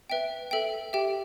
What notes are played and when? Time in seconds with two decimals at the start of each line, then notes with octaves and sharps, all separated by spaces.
0.10 B4 E5 G5
0.51 A4 E5 G5
0.93 G4 E5 G5